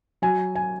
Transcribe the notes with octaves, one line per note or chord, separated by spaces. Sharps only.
F#3 G#5
G#5